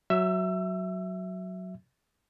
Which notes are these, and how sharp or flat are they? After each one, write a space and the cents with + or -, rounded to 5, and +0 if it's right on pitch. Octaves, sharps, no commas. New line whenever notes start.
F#3 +0 E5 +0 E6 +30